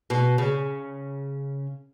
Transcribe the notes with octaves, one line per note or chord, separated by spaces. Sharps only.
B2
C#3